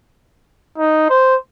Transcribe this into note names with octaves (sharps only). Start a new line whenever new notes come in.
D#4
C5